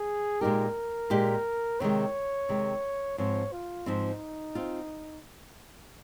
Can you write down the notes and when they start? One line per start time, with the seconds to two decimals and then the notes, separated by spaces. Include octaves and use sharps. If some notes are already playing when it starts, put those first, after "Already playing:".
Already playing: G#4
0.41 A#2 G#3 D#4 G4 A#4
1.10 A#2 G#3 D#4 G4
1.80 C3 D#3 G#3 C#5
2.49 C3 D#3 G#3
3.18 G#2 F3 C4 C#5
3.52 F4
3.86 G#2 F3 C4 D#4
4.55 C4 F4